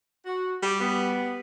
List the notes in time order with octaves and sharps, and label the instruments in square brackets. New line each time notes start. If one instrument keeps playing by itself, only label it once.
[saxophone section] F#4
[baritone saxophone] G3 [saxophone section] G4
[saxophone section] B3